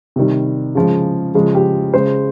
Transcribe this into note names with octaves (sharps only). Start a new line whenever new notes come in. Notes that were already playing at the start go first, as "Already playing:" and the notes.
C3 D#3 G3
C#3 F3 G#3
C#3 F3 G#3
G4
C#3 G#3 C5